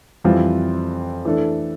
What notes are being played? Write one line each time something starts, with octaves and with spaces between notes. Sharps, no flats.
F2 E3 G3 C4 F4
E3 A3 D4 A4